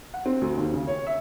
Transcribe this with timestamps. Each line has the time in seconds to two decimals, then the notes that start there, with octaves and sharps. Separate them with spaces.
0.14 F#5
0.26 C4
0.41 D2
0.58 D#2
0.74 C#3
0.88 C#5
1.07 E5